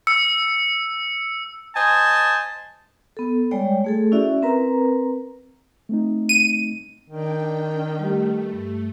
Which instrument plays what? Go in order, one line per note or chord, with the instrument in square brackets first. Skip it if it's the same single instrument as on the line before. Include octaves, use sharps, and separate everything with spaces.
[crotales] E6 C#7
[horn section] C5 D#5 G#5 A5
[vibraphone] B3 A4
G3 G#3 C#5 D5 G5
A3 G#4 A4
C#4 E4 F#4 D5 E5
C4 A#4 B4 A#5
[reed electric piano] A3 C4 D#4
[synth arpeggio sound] D#7
[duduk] D#3 [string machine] D4 G5
[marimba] G3 G4 [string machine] A3
[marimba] G2